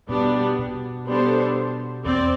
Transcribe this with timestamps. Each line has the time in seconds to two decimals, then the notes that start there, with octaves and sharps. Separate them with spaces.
0.09 B2 G3 B3 D4
0.59 B2
1.07 G3 B3 D4 A4 C5
2.05 E2 C4 D5